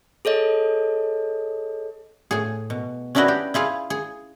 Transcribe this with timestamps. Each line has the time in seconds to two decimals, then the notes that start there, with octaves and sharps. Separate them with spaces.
0.25 G#4 A4 C#5 D#5
2.31 A2 G#4
2.70 B2
3.15 C#4 D4 E4 F#4 B4 D#5
3.28 G4
3.54 E4 F4 G#4 F5
3.90 G#4